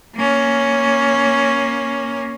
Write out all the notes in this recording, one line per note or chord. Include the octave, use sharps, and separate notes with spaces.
A#3 C#4